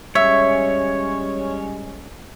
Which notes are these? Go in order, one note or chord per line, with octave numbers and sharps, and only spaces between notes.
G3 G#3 C#4 C#5 E5